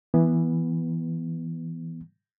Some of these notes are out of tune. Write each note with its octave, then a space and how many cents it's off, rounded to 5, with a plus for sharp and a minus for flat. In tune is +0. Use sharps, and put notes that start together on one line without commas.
E3 +0 B3 -10